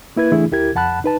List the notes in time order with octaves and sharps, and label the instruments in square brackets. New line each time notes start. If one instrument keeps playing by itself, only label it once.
[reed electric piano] A#3 E4 B4 G#6
E3 A3 D4 E4 G#4
D2 E4 G4 A#4 G#6
F2 F#5 A5 B5 F#6
D#4 B4 A5